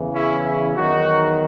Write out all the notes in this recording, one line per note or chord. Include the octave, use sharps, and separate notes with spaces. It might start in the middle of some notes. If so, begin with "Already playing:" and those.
Already playing: E2 C#3 E3
C#4 E4
C#4 E4
E2 D#3 F#3 D#4 F#4